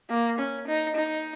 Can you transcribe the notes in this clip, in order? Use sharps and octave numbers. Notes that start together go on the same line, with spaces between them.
A#3
C#4
D#4
D#4